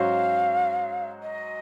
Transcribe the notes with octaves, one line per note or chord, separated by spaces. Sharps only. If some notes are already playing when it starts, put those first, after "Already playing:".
Already playing: G#2 F#3 C#4 F#4 C5 F5
D#5